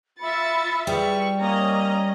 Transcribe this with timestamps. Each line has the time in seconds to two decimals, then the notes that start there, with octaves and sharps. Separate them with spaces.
0.20 F4 E5 B5 A6 C#7
0.87 G3 G#4 B4 C#6
1.40 A#3 C#4 D#5 A#5